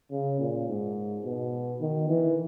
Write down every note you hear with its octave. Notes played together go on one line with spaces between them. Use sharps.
C#3
A#2
G#2
B2
D#3
E3